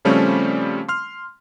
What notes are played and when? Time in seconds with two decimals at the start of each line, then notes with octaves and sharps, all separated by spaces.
0.05 C#3 F3 G3 A3 C4 C#4
0.89 C6 F6